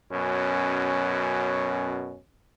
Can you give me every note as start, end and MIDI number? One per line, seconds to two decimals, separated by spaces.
0.11 2.18 42
0.11 2.18 47
0.11 2.18 61